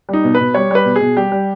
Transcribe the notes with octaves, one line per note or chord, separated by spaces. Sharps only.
G3 D#4
B2
B4
B2
G3 C#5
G3 B4
B2
G#4
B2
G3 G4
G3